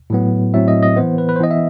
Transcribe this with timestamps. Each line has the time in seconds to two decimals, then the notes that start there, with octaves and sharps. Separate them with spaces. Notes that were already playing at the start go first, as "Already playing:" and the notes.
0.10 A2 F#3 B3
0.54 A2 F#3 C4 E5
0.68 D#5
0.83 D#5
0.96 E3 B3 C5
1.18 B4
1.29 B4
1.36 C5
1.40 E3 B3 D#5
1.51 E5